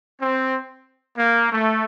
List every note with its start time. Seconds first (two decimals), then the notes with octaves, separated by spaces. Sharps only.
0.19 C4
1.16 A#3
1.50 A3